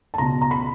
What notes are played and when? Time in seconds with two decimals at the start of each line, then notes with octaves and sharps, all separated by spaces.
0.14 A5
0.18 C#2 B2 A#5
0.42 A#5
0.51 B5